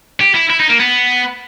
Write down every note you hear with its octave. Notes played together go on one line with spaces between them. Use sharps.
G4
E4
E4
D#4
A#3
B3